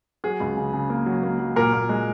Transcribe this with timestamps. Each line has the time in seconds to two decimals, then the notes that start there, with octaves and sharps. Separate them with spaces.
0.24 F#3 G#4
0.40 C#2
0.57 C#3
0.73 C#3
0.90 A#3
1.06 F#3
1.23 A#3
1.39 F#3
1.56 A#2 A#4
1.73 A#2
1.89 G#3